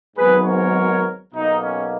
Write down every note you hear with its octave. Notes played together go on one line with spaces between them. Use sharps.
G#1 G#2 F#3 B3 G#4 B4
A#4 C#5
B1 B2 A#3 D#4
C#4